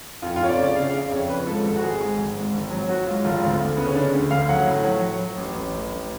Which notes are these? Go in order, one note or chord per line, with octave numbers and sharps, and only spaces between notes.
F2 F4
F4
F1 C#5
D5
C#3
D5
C#3 F5
F5
C#3
D5
F2 C#5
F3 B4
G#2 A4
G#1 A4
F#4
G#3 G#4
G#2
G#1
G#2
G#1
F#3
F#3 F#4
G#2 F4
G#1 F4
D2
D2
C#3 B3
C#4
C#3 D4
D2
D2 F5
F#3 F#5
A2
F#3
F#3
F#3
A1
A1
A1
A1